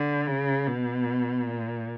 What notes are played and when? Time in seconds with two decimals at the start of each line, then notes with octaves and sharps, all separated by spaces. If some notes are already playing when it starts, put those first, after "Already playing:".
Already playing: D3
0.27 C#3
0.68 B2
1.48 A#2